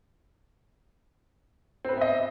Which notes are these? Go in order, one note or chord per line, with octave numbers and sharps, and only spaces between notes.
B3 C4 B4 D#5 E5